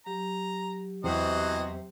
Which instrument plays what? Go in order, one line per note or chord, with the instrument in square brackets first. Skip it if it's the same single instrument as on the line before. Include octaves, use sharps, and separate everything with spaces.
[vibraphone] F#3 G4 [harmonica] A#5
[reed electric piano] E2 [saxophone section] C3 C4 [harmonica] E3 F#4 D#5